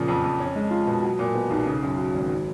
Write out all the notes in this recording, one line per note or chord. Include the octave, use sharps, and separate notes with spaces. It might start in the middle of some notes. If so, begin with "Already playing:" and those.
Already playing: A#2 C#3 F3
F2
F2
C#4
G#3
F4
B2
F#3
A#2
B3
B1
C#3
F#2
F#3
G#1
F#3